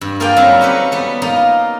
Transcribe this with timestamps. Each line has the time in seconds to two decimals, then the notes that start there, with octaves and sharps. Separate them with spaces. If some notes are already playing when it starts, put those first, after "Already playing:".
0.01 G2
0.20 A#3 F4 G#4 A#4 D5 G5
0.36 F#3 G3 C4 C#4 D#4 E4
0.61 C#4 F#4 G4 A4 B4
0.92 G3 B3
1.22 A#3 D#4 F4